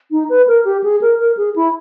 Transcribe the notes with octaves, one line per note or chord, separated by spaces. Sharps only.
D#4
B4
A#4
G4
G#4
A#4
A#4
G#4
E4